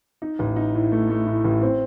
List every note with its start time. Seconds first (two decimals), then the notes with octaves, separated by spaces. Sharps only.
0.22 D#4
0.39 A1
0.56 D#4
0.75 A2
0.92 A3
1.10 A3
1.27 A2
1.44 A1
1.61 C4